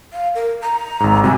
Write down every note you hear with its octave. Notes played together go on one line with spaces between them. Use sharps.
F5
A#4
A#5
G#1 G#2
C3 G3 F#4 G#5